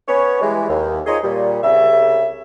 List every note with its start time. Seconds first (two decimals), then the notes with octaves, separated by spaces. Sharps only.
0.08 B3 C#4 C#5
0.41 E3 G3 G#3
0.69 D#2
1.07 D#4 F4 G#4 C5 C#5 D#5
1.23 A#2 G3
1.63 C2 C#3 E5